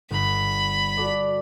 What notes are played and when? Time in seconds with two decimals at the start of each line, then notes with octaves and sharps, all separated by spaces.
0.11 G1 B5
0.97 F#4 A4 D5